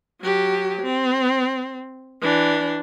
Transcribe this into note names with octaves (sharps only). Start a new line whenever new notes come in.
F#3 G4
C4
E3 D4